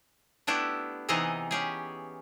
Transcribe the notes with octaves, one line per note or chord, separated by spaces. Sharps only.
A3 B3 D4 E4 G4
C3 E3 B3 D#4 G#4 D#5
C#4 G4 G#4